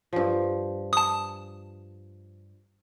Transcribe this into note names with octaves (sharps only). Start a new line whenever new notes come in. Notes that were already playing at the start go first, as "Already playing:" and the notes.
G2 F3
A5 D#6